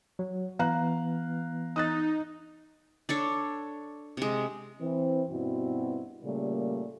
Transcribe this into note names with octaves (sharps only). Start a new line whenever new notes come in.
F#3
E3 B3 F5 A#5 F#6
D#4 D#6 F#6 A6
D4 A4 C#5
C3 G#3
E3 C4
G2 B2 C4 E4 F#4
A#2 C#3 G3 A3 A#3